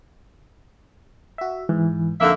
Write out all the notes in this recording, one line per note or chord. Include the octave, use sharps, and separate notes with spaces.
F#4 E5
G#2 E3
F2 D3 A#3 D#4 E5 F#5